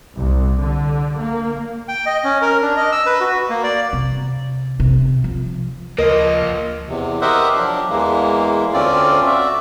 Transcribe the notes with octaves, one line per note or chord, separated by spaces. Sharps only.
C2
D3
A#3
G5
D#5
C#4
A#4
D4
D#5
E6
B4
F#4
A#3
D5
C3
C3
F3
D2 C#3 F3 A#3 A#4 D#5
E2 C3
G4 A#4 C5 D#5 E5 F#5
F3 F#3 D4 G4
E2 E3 G#3 A#3
D2 A3 C4 C#4 F4 D5
F#4 D5 E5